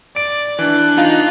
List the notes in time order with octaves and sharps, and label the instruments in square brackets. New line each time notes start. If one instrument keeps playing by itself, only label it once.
[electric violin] D5 [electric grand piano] D7
[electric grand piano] E3 [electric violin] D4 F#6
[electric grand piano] D#4 [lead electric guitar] F4 [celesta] F5